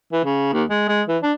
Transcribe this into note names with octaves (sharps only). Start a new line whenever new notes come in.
E3
C#3
D#2
G#3
G#3
E3
D4